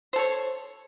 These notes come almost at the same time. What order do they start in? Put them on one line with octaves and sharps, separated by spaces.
C5 A4 C#5